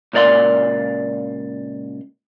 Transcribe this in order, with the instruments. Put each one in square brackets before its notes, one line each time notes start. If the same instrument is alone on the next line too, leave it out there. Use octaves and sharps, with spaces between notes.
[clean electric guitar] C#2 A#2 A#4 D5 F5 C6